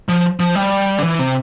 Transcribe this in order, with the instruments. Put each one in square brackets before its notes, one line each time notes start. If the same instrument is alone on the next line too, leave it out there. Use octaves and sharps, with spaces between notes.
[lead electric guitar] F3
F3
G3
D3
E3
C3